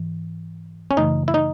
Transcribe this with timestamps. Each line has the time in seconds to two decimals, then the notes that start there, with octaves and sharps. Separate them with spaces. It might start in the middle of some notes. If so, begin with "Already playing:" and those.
Already playing: G#2 E3
0.91 C#4
0.97 F#2 C#3 E3 A3 D#4
1.28 E4
1.34 D#4